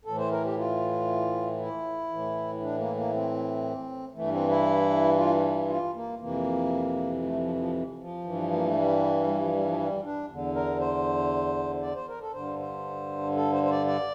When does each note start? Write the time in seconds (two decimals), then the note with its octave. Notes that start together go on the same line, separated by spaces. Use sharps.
0.05 A2 E3 A4
0.18 C5
0.31 A#4
0.44 G4
0.57 F4
1.59 E4
2.10 A2 E3
2.61 D4
2.78 A#3
2.96 A#3
3.13 C4
4.15 G2 E3 A3
4.32 C4
4.49 E4
5.17 F4
5.68 F4
5.94 A#3
6.19 F2 C3 E3 A#3
7.22 A3
7.39 F3
7.56 F3
7.99 F3
8.24 G2 E3
8.53 A#3
8.64 A3
8.76 G3
9.26 G3
9.39 F3
9.52 G3
9.65 F3
9.78 G3
10.03 D4
10.28 E2 D3
10.55 A#4
10.79 C5
11.82 D5
11.95 C5
12.08 A#4
12.20 A4
12.33 G2 D3 C5
12.59 C5
13.36 A4
13.53 C5
13.63 C5
13.70 D5
13.87 D5